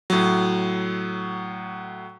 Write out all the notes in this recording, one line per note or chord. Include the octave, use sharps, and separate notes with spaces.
A2 F#3